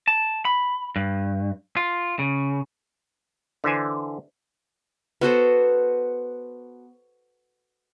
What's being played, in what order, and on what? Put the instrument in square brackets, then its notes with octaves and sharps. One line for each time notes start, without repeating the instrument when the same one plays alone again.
[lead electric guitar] A5
B5
G2
F4
C#3
[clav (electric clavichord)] D3 E3 C5 G#5
[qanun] B3 F#4 A4 C5